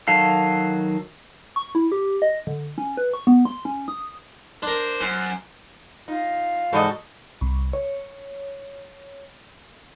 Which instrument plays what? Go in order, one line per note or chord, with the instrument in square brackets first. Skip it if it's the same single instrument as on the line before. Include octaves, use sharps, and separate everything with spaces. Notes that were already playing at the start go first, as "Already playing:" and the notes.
[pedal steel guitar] D#3 F#3 A4 F5
[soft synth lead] C#6
E4
G4
D#5
D3
C#4
B4
C#6
B3
C6
C#4
D#6
[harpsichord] D4 A#4 [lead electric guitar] C5
[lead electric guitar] F#2 [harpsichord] C5 C6
[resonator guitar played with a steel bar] D#4 [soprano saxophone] F4
[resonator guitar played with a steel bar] F2 E3 C5 [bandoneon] G#2 F#4 [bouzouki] A4 D5 D#5
[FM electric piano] C2
C#5